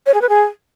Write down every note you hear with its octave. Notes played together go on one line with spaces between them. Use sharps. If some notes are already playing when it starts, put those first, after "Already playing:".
C#5
G#4
B4
G#4